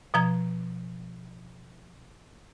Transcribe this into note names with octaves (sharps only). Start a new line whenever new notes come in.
B2 F3 A#5 G#6